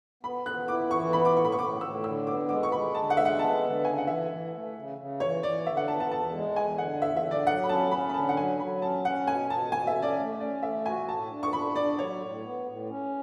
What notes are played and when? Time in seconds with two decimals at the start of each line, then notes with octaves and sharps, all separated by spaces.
0.23 B3 B5
0.46 B3 F#6
0.68 E4 D6
0.91 E3 C#6
1.13 B3 B5
1.25 D6
1.36 A2 C#6
1.45 B5
1.52 C#6
1.59 A2 D6
1.81 A2 E6
2.04 D3 E6
2.27 B3 D6
2.49 G#3 D6
2.63 C#6
2.72 G#3 B5
2.94 D3 A5
3.10 F#5
3.17 G#3 E5
3.25 F#5
3.39 B3 A5
3.62 D3
3.85 C#3 G#5
3.98 F#5
4.07 E3 E5
4.30 E3
4.53 A3
4.76 C#3
4.98 C#3
5.20 E3 C#5
5.43 E3 D5
5.66 D3 E5
5.77 F#5
5.88 B3 A5
6.00 A5
6.11 E2 A5
6.34 G#3
6.56 E2 G#5
6.78 D3 F#5
7.02 E2 E5
7.16 E5
7.24 D3
7.31 D5
7.47 F#3 F#5
7.64 B5
7.69 C#4 A5
7.91 C#4 B5
8.09 B5
8.14 D3 A5
8.29 F#5
8.37 F#3 G#5
8.59 F#3 B5
8.82 C#4 A5
9.05 C#4 F#5
9.27 B2 G#5
9.50 B2 A5
9.72 B2 G#5
9.87 E5
9.95 C#4
10.02 D5
10.18 A3
10.40 C#4 D5
10.63 A3 E5
10.86 F#4 G#5
11.08 A2 A5
11.31 D4
11.43 C#6
11.53 D4 B5
11.75 D4 D5
11.98 F#3 C#5
12.21 A2
12.44 B3
12.67 A2
12.89 C#4